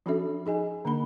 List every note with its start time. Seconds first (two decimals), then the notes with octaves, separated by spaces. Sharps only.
0.06 F3 C#4 D4 F#4 A4 E5
0.46 D#4 G#4 D#5 G#5
0.85 D3 A#3 D4 B5